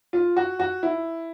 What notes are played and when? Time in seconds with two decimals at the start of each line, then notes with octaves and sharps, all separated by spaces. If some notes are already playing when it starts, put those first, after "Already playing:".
0.13 F4
0.37 F#4
0.60 F#4
0.83 E4